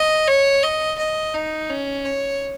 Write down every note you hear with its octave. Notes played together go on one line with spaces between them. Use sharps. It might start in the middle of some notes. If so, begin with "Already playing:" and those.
Already playing: D#5
C#5
D#5
D#5
D#4
C#4
C#5